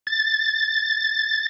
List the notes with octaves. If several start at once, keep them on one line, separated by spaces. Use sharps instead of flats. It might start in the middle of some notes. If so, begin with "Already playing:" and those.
A6